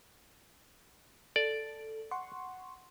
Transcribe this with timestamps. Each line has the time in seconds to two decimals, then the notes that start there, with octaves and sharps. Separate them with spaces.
1.36 A4 D5
2.11 F#5 C6 C#6